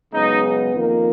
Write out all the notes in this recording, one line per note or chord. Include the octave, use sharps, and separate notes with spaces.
F#2 C#3 G#3 B3 D#4
F2 D#3 A#3